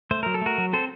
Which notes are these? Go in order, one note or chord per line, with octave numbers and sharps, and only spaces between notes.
A3 C5
F#3 A#4
A4
A3 F#4 A#4
F#3
C4 A4 C5